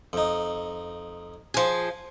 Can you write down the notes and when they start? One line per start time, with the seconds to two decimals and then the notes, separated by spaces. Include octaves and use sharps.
0.13 F2 D#4
1.54 F3 G#4